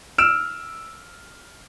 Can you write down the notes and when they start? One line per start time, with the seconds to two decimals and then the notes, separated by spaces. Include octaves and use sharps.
0.18 E6 F6 D7 E7